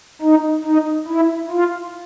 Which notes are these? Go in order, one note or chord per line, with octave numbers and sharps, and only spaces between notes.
D#4
D#4
E4
F4